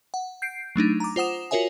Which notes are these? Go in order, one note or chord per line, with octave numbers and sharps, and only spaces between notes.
F#5
G6 C7 D7
F#3 A3 D4 D#4
A#5 D6
F4 C5 F#5 D#6 E7
F4 F#4 A#4 C#5 E5 G#5